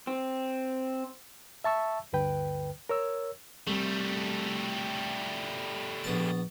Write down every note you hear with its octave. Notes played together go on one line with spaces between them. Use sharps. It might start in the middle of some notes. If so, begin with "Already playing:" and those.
C4
E5 A5 C#6 E6
D2 G2 D3 B4 G5
A#4 C#5 E6
C2 G3 A3
A#1 B3 A5